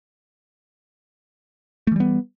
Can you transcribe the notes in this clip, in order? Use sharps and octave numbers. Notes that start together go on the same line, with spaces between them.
E3 G3 A3 B3